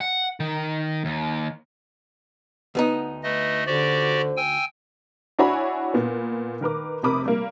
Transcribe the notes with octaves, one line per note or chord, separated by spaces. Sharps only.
F#5
D#3
D#2
D2 B3 D#4
A3 B4 D#5
D3 F#4 G4 C5 D5
G5 G#5 E6
D4 E4 F#4 C#5 G#5 B5
A#2 B3
D#3 A#4 B4 D6
F1 C3 A#4 B5 D6 D#6
G3 A#3